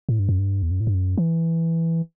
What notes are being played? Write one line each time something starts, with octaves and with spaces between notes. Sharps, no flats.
A2
G2
F#2
G2
E2
F#2
A2
G2
F#2
E3